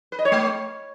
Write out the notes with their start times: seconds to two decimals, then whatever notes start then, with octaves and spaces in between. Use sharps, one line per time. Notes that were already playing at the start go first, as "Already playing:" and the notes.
0.12 B4
0.19 D#5
0.25 C#5
0.32 A3